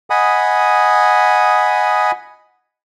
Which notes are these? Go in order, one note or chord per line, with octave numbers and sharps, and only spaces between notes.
D#5 F#5 G#5 B5 D#6